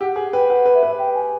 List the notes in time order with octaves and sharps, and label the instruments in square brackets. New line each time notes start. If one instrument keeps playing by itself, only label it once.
[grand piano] G4 [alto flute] F#5
[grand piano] G#4 [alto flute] F#5
[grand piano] B4 [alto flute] G5
[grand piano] B4 [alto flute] F#5
[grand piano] B4
[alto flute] E5
[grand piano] B4
[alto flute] G5
G#5